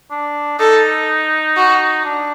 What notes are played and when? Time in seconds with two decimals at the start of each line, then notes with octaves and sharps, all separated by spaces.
0.11 D4
0.59 D#4 A4
1.57 F#4
2.05 D4